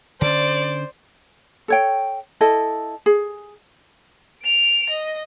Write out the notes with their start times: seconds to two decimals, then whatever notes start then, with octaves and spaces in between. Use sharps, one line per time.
0.21 D3 C#4 C5 D5
1.68 A4 C#5 G5
2.41 E4 A4 D#5
3.06 G#4
4.43 D7 F7
4.90 D#5